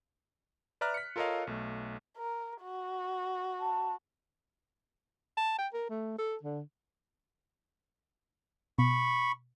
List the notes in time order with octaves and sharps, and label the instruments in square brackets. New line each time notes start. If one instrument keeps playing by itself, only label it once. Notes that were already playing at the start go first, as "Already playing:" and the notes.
[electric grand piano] B4 D5 E5 A#5 F6 F#6
B6 C#7
F4 A4 A#4 C#5 D#5 F5
B1 A3
[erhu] A#4
F#4
[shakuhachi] A5
[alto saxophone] A5
G5
A#4
A3
A4
D3
[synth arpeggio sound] B2 [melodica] B5 C#6